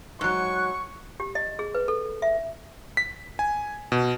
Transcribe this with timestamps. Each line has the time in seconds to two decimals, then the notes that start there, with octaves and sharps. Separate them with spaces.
0.21 G#2 F#3 C#6 F#6
1.20 G4
1.35 D#5
1.59 G#4
1.75 B4
1.88 A4
2.22 E5
2.97 B6
3.39 G#5
3.92 B2